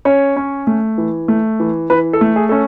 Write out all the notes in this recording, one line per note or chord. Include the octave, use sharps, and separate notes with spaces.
C#4 C#5
C#4
A3
E3
A3
E3
E3 B4
A4
A3
G#4
C#4 A4